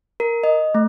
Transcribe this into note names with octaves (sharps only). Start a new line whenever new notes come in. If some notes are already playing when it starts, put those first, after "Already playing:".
A#4
D#5
A3